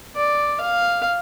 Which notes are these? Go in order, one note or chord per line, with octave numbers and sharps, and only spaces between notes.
D5
F5